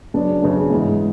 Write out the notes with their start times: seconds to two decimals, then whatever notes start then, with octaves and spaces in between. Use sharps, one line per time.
0.14 C#3 F#3 B3 D4
0.42 C#3 F#3 B3 D4
0.70 G#2 E3 G#3 B3